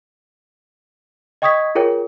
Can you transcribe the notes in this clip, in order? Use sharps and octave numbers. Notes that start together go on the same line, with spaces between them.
D#5 G5 C#6 D#6 G#6 B6
F4 G#4 A#4 C#5 G5